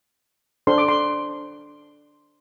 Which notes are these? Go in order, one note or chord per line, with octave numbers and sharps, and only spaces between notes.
D4 A4 C5 C6
D6
C6